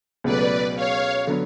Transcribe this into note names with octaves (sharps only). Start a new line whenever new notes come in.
C#2 B2 F#3 A3 B4 D5
C#5 F5
D3 F#3 B3